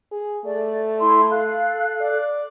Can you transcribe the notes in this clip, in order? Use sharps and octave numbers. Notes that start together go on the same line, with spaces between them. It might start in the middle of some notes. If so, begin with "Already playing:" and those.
G#4
A3 D5
E4 C6
A4 F5 F#6
D5